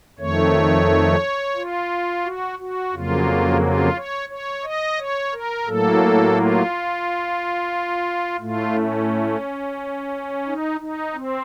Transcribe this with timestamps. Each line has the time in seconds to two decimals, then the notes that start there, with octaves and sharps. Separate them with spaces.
0.19 F2 D#3 A3 C#5
1.56 F4
2.24 F#4
2.59 F#4
2.93 F2 C#3 F#3 A#3 F4
3.61 F4
3.96 C#5
4.29 C#5
4.64 D#5
4.98 C#5
5.33 A#4
5.66 A2 F#3 A#3 A4
6.35 F4
8.40 A2 A3 F4
8.74 C#4
10.46 D#4
10.80 D#4
11.14 C4